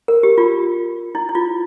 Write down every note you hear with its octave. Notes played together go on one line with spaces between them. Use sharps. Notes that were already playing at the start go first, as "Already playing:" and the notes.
A#4
G4
F4
E4
E4
F4